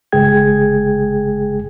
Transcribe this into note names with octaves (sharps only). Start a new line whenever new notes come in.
G1 C#3 G#3 G#4 G5 G#6